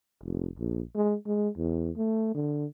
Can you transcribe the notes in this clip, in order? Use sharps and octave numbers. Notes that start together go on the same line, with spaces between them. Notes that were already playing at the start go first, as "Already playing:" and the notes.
F1
A#1
G#3
G#3
E2
A3
D3